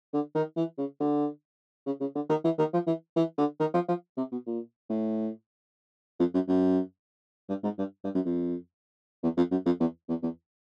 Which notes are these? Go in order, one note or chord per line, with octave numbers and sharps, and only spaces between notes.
D3
D#3
E3
C#3
D3
C#3
C#3
D3
D#3
E3
D#3
F3
E3
E3
D3
D#3
F3
F3
C3
B2
A#2
A2
F2
F#2
F#2
G2
G#2
G2
G2
F#2
F2
E2
F2
F#2
F2
E2
E2
E2